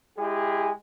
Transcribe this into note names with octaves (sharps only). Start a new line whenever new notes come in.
G#3 E4 G4 G#4